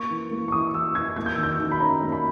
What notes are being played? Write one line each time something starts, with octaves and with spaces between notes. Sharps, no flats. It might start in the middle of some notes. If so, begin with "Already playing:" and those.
Already playing: A#3 C#6
E3
A#3
C#6
E3 D#6
E3 E6
E3 G#6
A#3 G#6
G6
D#3 E6
G6
D#3
B5
C#4 A#5
A#3
B5